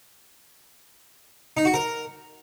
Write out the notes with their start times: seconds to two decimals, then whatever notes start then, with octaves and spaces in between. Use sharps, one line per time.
1.57 D#4
1.65 F#4
1.74 A#4